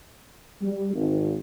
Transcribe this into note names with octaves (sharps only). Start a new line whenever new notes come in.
G3
G#1